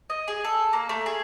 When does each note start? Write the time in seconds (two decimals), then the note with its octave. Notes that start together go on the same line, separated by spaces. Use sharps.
0.10 D#5
0.28 G#4
0.44 A4
0.73 A#3
0.89 A3
1.06 G#4